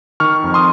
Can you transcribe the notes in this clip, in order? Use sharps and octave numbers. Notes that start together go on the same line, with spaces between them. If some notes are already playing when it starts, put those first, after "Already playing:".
D#3 C#6 F6
F2
C6 D#6